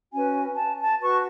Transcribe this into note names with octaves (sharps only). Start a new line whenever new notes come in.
C#4 F#4 B4 G#5
A5
A5
F#4 B4 C#6